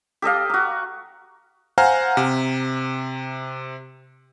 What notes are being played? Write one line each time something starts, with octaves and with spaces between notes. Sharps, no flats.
G4 A4 D#5 F5
F#4 A#5
C5 F5 F#5 G#5 A#5 F6
C3